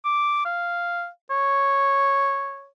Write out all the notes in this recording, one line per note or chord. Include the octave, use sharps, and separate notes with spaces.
D6
F5
C#5